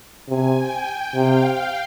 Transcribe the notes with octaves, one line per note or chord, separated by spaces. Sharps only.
C3 G#5
G5
C3 F5